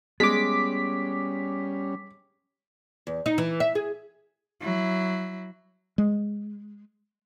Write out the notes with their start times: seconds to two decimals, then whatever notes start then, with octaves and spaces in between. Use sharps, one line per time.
0.20 G3 G#3 B3 C#4 D6 B6
3.07 E2
3.26 D#4
3.38 E3
3.60 E5
3.75 G#4
4.61 F#3 E4
5.98 G#3